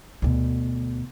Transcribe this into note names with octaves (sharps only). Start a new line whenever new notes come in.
D2 B2